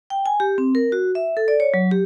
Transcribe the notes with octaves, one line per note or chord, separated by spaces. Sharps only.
G5
G#5
G4
C4
A#4
F#4
E5
A4
D5
C#5
F#3
G4